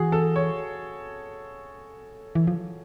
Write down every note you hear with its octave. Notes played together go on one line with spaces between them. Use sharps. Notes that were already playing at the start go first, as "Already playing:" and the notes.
Already playing: E3 F#4 G#4
A4
C#5
E3
F3